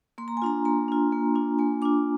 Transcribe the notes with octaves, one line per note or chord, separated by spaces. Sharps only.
A#3 C6
A#5
G#5
D4 F4 A#5
A#3 A#5
D4 F4
A#3
D4 F4
A#3 G#5
D4 F4 D6